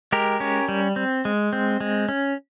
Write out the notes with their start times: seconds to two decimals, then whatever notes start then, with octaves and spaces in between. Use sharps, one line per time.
0.12 G#3 G4 A#4
0.40 C#4
0.69 G3
0.96 C4
1.25 G#3
1.53 C4
1.80 G#3
2.09 C#4